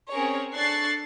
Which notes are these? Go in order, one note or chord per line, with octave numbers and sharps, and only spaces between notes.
C4 C#4 G#4 A#4 C#5
D4 A4 C#6 F#6 A6 C7